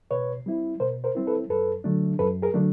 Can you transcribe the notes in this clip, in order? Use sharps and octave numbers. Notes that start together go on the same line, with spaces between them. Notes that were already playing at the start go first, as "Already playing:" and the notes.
B2 B4 C#5
G3 C4 E4
B2 A#4 C5
A#4 C5
G3 C4 E4
A4 B4
F#2 A4 B4
D3 F#3 A3 D4
F#2 A4 B4
G#4 A#4
D3 F#3 A3 D4